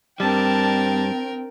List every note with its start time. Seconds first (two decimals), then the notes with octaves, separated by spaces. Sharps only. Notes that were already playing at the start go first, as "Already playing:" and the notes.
0.20 G2 G3 C4 D4 A#4 G5 A5